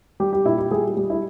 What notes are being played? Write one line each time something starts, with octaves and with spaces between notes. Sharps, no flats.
G3 G4
G4
A#2 E4
G4
G3 G#4
G3
E4